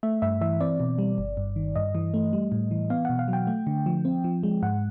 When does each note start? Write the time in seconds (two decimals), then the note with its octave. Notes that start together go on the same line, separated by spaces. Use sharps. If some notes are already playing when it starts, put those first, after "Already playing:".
0.03 A3 E5
0.22 G2 E5
0.41 E3 E5
0.61 C4 D5
0.80 B2
0.99 G3
1.18 G1
1.37 G2
1.56 D#3
1.76 G2 D#5
1.95 E3
2.14 A3
2.33 G3
2.52 A2
2.71 E3
2.90 B3 F5
3.05 B2 F#5
3.19 F5
3.28 F#3
3.33 G5
3.47 A3
3.67 D3
3.86 F3
4.05 C4
4.24 F3
4.43 G#3
4.62 G#2 F#5